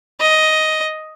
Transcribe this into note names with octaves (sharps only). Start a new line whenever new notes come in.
D#5